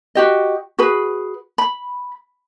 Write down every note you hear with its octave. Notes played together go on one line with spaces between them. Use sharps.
F#4 G4 D#5
F#4 G#4 B4
B5